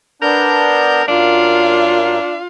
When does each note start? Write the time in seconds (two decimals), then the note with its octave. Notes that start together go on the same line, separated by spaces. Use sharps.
0.22 B3 D4 A#4 G6
1.08 F#2 A#3 D4 F4 F5